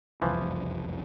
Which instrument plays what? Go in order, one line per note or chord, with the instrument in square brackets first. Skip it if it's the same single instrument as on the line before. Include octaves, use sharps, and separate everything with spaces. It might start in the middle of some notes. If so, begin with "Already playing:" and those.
[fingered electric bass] F#1 C2 F2 [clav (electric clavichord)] E3 F3